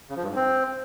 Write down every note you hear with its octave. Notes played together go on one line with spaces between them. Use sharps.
C#3
F3
G2
G#2
C4